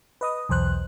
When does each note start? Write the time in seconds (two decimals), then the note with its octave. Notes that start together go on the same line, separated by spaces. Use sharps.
0.21 B4 D#5 D#6
0.49 B1 E2 C5 F#6